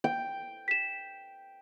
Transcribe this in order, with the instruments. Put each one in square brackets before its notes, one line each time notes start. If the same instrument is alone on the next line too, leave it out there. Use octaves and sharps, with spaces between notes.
[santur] G5
[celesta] B6 E7